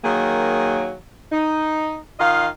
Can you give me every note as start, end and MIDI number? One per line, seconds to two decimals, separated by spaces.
0.04 0.94 51
0.04 0.94 54
0.04 0.94 58
0.04 0.94 68
1.31 1.98 63
2.19 2.46 51
2.19 2.46 65
2.19 2.46 75
2.19 2.46 77